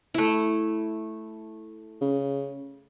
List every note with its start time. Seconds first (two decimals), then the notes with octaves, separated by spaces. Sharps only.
0.14 A3 E4
2.01 C#3